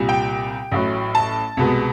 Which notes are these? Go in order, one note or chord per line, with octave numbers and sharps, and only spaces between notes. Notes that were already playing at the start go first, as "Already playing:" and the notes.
Already playing: C2 A#2 G3
G5
A1 A2 F#3
A5
C2 B2 G#3 B3